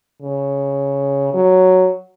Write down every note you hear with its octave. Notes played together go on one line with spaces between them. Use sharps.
C#3
F#3